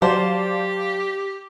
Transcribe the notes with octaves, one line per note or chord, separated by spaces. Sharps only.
F#3 G4 C5 D5 F5 A5